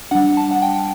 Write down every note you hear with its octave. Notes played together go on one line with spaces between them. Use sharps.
G3 D4 F#5
A5
F#5
G5